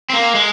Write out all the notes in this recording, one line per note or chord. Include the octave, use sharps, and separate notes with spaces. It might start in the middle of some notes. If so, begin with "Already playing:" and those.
C4
A#3
G#3